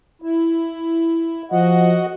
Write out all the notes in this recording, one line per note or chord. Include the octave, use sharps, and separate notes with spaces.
E4
F3 F#4 D#5 F#5